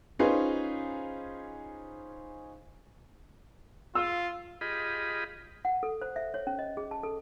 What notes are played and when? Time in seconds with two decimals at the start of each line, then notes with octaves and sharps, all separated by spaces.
0.19 C#4 D#4 F4 G#4 B4 C5
3.95 F4 E6
4.61 F4 G4 G#4 D#5 B5
5.65 F#5
5.83 A4
6.02 C5
6.16 E5
6.34 C#5
6.47 C#4
6.59 D#5
6.77 G#4
6.91 A5
7.03 A4